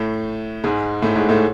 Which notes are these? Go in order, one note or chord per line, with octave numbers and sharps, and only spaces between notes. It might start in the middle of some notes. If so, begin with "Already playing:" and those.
Already playing: A2 A3
G#2 G#3
A2 A3
G#2 G#3
A2 A3